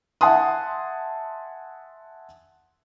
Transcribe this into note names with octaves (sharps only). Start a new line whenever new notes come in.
E5 F#5 G#5 A5 C6 D#6